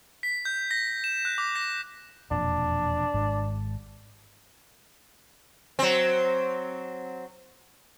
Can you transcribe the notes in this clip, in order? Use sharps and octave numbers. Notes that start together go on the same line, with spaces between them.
B6
G6
A#6
E7
F#6
D6
A#6
E1 F2 A#2 D4
G#1 G#2 G#3
F#3 C4